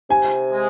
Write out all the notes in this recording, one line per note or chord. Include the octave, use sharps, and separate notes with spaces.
C3 G#5
G#3